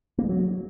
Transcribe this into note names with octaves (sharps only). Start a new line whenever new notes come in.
A#3
G#3
F#3